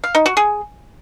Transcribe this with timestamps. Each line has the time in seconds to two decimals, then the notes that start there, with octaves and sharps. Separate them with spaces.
0.04 F5
0.15 D#4
0.26 F#4
0.37 G#4